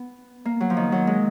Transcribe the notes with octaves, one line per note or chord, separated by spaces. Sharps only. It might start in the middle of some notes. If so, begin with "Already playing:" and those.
Already playing: B3
A#3
F#3
F3
D#3
F#3
G#3